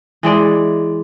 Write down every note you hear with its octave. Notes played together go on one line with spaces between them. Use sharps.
E3 G#3 D5